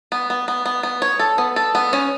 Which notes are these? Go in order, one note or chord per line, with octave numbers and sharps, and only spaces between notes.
B3
B3
B3
B3
B3
C#5
A4
B3
A4
B3
C#4